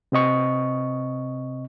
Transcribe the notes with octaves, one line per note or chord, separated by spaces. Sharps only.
C3 C4 D#5 C#6